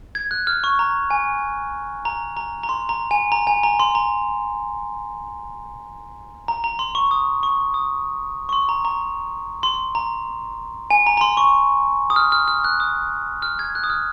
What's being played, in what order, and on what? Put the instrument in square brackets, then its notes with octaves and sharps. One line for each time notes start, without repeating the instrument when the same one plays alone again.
[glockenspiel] G#6
F#6
F6
C#6
A#5
G#5
A#5
A#5
A#5
C6
A#5
G#5
A#5
G#5
A#5
C6
A#5
A#5
A#5
C6
C#6
D#6
C#6
D#6
C#6
C6
A#5
A#5
C6
A#5
G#5
A#5
A#5
C6
C#6
D#6
F6
F6
F6
F#6
D#6
F6
G#6
F#6
D#6
F6